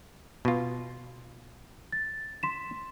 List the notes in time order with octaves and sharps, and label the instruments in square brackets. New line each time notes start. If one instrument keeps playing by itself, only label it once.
[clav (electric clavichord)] B2 F4
[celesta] A6
C6 B6 E7